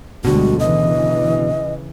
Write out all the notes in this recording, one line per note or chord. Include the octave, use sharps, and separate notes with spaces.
D2 B2 D3 G3 G#3 F#4
C#3 E3 D#5